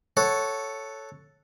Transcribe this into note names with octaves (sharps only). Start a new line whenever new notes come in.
A4 C#5 F#5